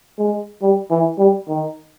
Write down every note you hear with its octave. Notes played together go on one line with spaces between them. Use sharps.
G#3
G3
E3
G3
D#3